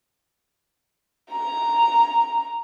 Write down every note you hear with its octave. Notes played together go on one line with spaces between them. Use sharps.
A#5